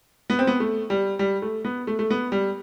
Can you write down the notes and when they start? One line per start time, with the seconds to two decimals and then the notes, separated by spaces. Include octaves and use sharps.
0.30 B3
0.39 C4
0.47 B3
0.60 A3
0.90 G3
1.19 G3
1.42 A3
1.65 B3
1.87 A3
1.99 A3
2.10 B3
2.32 G3